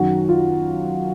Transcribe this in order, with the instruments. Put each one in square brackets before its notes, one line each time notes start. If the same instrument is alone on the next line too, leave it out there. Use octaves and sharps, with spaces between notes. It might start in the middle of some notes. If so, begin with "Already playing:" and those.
Already playing: [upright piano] F#2 D#3 F#4
F4